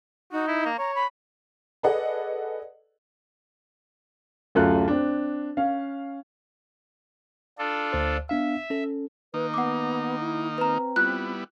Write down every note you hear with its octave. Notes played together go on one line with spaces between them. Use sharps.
D#4 F#4
E4
A#3
C#5 A#5
B5
G#4 A4 B4 D5 D#5 F#5
D1 F#2 A3 F4 F#6
C4 D4
C#4 F5
D4 F4 A4
D2 C5
B3 D4 E5 F5
C#4 A4
D#3 A#3 D#4 B4
B3 F#5 D6
E4
C4 B4 A#5
G3 B3 E4 F4 F#6